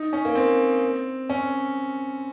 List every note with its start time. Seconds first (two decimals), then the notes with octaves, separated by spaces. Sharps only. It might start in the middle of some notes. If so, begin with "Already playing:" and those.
Already playing: D#4
0.13 C#4
0.25 A#3
0.35 C4
1.30 C#4